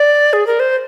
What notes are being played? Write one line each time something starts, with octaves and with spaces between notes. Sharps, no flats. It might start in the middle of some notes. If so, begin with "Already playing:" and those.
Already playing: D5
G#4
A#4
C5